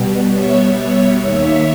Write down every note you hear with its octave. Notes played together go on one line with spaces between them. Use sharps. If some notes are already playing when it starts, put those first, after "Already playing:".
Already playing: B2 G3 B3
C#5 E5
C#5 E5
D#2 D#3 A#3 C#5 E5